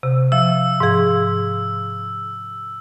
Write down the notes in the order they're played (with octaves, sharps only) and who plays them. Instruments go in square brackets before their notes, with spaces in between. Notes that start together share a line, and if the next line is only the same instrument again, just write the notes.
[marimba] C3
[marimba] F3 E5 [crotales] E6
[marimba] G#2 F3 G#4